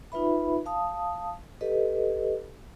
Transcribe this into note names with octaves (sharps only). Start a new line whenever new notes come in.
D#4 F4 B4 E5 B5
F5 A5 D#6
G4 A4 B4 D#5